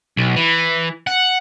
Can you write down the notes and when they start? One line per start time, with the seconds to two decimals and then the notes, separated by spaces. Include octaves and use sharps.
0.17 B1
0.37 E3
1.07 F#5